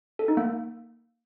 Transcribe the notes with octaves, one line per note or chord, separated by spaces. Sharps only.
A4
D#4
A#3